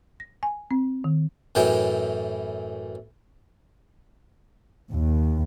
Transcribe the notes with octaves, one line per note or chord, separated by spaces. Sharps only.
A#6
G#5
C4
D#3
F#2 A2 E3 G5
D#2